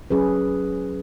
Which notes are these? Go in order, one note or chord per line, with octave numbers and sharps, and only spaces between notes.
F#3 C#4 G#4 B4